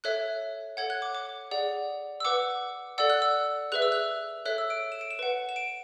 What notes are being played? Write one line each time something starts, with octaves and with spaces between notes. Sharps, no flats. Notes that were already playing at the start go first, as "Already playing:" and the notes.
A4 C#5 E5 F#6
A4 C#5 F#5 G#6
F#6
D6
D6
G#4 D5 F#5
E6
B4 F#5 D6
A4 D5 F#5 E6
F#6
E6
G#4 B4 E5 F#6
E6
F#6
A4 C#5 E5 F#6
E6
D7
E7
D7
E7
B4 F#5
E7
D7